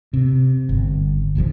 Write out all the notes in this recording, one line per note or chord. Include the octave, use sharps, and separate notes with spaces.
C3
G1
E1 A#1 E3 F3